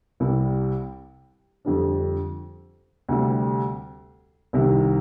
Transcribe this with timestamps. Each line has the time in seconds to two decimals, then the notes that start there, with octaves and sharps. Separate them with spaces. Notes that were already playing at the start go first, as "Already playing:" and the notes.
0.20 C2 C3 G3
1.65 F2 D3 G3 D4
3.09 D2 C3 G3
4.53 C2 C3 D#3